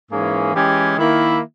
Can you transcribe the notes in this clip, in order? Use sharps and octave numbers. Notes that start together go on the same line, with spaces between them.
G#2 E3 A#3 C#4 G#4
E3 G#3 C#4 G4
D#3 A#3 E4